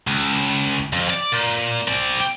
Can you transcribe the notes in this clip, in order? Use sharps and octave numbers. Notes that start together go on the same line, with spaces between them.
C#2
F2
D5
A#2
C4 D5